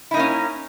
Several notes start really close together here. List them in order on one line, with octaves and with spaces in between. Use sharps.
E4 D#4 A#3 C#4